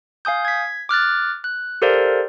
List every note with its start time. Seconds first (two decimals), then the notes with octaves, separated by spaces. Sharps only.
0.25 F5 G#5 D#6 G6
0.45 G#6 B6
0.89 D6 F6 F#6 A6
1.44 F#6
1.82 G4 A4 A#4 C5 D5 F5